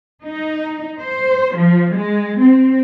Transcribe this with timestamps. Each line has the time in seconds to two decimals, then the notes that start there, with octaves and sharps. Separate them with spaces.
0.24 D#4
1.00 C5
1.56 F3
1.94 G#3
2.40 C4